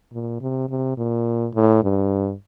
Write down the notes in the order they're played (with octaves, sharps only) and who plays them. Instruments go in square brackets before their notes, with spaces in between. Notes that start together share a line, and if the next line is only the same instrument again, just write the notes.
[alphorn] A#2
C3
C3
A#2
A2
G2